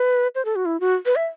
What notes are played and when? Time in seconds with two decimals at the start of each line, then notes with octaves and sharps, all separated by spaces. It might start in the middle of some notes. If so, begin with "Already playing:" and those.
Already playing: B4
0.35 C5
0.45 A4
0.56 F#4
0.66 E4
0.80 F#4
1.06 B4
1.16 E5